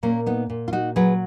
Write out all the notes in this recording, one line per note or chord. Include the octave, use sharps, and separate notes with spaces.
A#2 A#3 C#4
B3 D#4
A#2
F4
D#4 F#4
F#3 G#4 B4